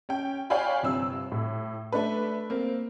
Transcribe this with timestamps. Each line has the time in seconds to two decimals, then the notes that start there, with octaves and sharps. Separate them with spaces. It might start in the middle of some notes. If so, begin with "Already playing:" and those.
0.09 C#4 G5
0.50 C#5 D5 F5 G5 G#5 B5
0.83 G1 C3 E6
1.32 A2
1.92 A3 D4 B4
2.50 A#3 C4